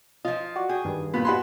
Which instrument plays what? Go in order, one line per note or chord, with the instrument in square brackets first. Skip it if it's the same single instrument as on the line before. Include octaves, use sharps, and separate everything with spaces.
[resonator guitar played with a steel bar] F3 F4 [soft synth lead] D#5
[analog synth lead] F#4 [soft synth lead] D5
[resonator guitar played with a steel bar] G#4 [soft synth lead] G5
[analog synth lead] G2 [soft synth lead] D#3
[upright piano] A#2 [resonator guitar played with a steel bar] B3 [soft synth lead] B5
[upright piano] F#4 B5 C6 [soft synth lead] G#5